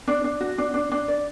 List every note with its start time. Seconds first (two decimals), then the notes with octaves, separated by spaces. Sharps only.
0.08 D4
0.24 D4
0.41 F#4
0.58 D4
0.74 D4
0.92 D4
1.08 D5